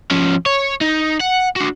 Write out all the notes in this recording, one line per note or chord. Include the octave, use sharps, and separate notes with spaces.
F3 C#4
C#5
D#4
F#5
D4 F#4